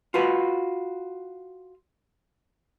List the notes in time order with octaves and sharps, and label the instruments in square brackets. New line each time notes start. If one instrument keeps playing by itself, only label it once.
[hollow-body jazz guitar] F4 F#4 B4